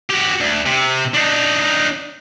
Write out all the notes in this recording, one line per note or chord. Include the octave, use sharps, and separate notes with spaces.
F#4 G4
D2
C3
D4 D#4